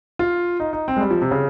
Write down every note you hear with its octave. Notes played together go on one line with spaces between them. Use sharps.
F4
D#4
D#4
C4
G#3
G3
F3
C3
C#3